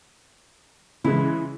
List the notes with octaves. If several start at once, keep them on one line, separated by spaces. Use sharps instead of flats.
C#3 E3 G#3 E4